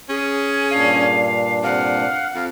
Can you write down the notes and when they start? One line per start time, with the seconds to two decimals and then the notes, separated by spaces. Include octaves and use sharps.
0.09 C#4 G#4
0.70 G2 A#2 D4 F5
1.63 C3 F5 F#5
2.35 F2 F5